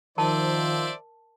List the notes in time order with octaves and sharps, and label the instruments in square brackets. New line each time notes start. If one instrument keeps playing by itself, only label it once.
[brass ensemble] D#3 F3 [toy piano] A#4 A5 [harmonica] C5 D5 E5